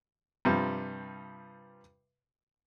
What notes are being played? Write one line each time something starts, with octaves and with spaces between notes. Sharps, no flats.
G2 C3 F3 G3